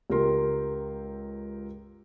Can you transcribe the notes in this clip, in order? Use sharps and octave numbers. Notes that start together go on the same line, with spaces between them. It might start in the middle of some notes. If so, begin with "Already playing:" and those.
C#2 G4 A#4 C6